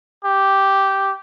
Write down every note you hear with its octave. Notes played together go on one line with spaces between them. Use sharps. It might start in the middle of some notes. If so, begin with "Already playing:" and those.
G4